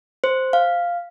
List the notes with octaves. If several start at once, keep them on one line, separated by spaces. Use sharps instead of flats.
C5
F5